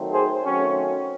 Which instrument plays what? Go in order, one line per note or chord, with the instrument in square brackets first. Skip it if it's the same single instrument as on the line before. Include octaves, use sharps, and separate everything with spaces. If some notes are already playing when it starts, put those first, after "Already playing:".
Already playing: [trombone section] D#3 F#3 A3 C4
G#4 C5
D#3 F#3 A3 C4 C#4